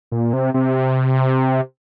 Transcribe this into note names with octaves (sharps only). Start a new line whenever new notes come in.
A#2
C3
C3